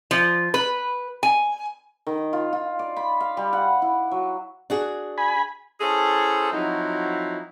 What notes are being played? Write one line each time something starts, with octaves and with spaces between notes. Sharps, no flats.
F3
B4
G#5
D#3
F4
F4
D5
B5
F5
G3
F#5
E4
F#3
D4 F#4 G#4
G#5 B5
C#4 E4 G#4 A4 C5 A5
F3 F#3 C4 D#4 E4 F#4